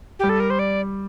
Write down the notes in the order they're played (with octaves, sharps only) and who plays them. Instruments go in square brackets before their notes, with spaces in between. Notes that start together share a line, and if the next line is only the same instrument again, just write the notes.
[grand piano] G3 [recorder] G4
[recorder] A4
A#4
C5
D5